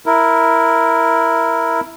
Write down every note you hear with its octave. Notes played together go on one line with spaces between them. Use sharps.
E4 A#4